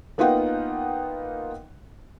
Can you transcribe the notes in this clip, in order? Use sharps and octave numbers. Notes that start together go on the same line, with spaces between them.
A#3 B3 D#4 F4 F#5 G5